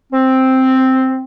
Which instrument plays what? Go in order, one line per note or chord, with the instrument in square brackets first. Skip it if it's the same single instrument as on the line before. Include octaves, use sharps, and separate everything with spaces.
[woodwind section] C4